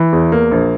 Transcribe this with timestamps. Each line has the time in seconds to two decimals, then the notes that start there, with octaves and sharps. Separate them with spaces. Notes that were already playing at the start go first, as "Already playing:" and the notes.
Already playing: E3
0.12 E2
0.32 A#3
0.51 A#1